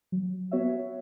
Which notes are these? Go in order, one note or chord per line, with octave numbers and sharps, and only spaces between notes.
F#3
B3 F#4 C#5 E5